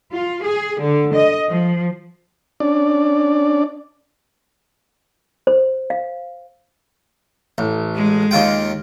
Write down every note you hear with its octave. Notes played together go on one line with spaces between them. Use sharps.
F4
G#4
D3
D#5
F3
C#4 D4 D5
C5
F5
A1
G#3
D#2 F4 G5